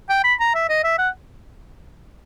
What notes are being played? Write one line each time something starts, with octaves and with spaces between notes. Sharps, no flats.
G5
B5
A#5
E5
D#5
E5
F#5